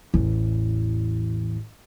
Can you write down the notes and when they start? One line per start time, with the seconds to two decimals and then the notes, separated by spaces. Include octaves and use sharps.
0.14 A1 E2